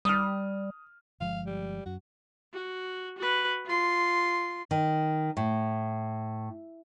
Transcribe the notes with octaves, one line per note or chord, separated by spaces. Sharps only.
G3 D#6 F6
G1 F3 G#3 F5
G3
F#2 F#4
F#4
F#4 B4
F4 C6
D#3
A2